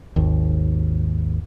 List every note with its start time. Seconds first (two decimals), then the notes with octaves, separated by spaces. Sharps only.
0.16 G#1 D#2